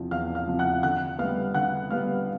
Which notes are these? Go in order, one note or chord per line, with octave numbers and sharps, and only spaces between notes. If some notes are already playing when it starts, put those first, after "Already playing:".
Already playing: E2 C3 F3
E2 F5 F6
F5 F6
C3 F3
F#5 F#6
D3 F#5 F#6
G3 B3 F5 F6
D3 F#5 F#6
G3 B3 F5 F6